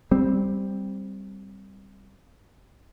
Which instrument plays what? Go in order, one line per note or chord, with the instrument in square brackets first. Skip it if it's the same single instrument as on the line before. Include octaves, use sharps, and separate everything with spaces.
[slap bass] G3 C4